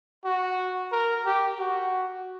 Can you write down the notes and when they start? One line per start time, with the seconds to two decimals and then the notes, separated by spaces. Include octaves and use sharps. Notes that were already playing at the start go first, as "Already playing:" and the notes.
0.25 F#4
0.92 A#4
1.26 G4
1.60 F#4